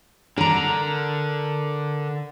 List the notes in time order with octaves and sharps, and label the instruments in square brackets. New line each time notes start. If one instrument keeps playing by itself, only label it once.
[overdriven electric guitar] D3 [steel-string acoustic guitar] A#4 A#5